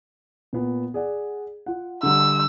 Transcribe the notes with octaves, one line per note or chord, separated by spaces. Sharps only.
A#2 B3
G#4 D5 F#5
F4 F#5
D3 G3 E6